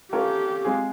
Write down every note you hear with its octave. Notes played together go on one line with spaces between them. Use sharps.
A3 C#4 F4 G4 A#4 C#5
G#3 C4 F4 G#4